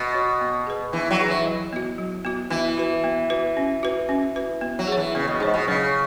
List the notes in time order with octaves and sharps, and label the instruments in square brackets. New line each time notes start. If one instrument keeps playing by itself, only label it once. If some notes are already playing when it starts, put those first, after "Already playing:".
Already playing: [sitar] B2
[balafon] F#4 C#5
B3
G#4 B4
[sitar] E3 [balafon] B3
[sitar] F#3
[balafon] G#4 B4
[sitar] E3
[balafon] F#3
B3 F#4
F#3
B3 F#4
[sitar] E3 [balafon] B3
[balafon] F#4 B4
B3
F#4 B4
C#4
F#4 B4
C#4
F#4 B4
B3
[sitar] F#3
[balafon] G#4 C#5
[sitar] E3
[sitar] C#3 [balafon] B3
[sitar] B2
[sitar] G#2 [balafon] G#4 C#5
[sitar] B2
[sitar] C#3 [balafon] F#3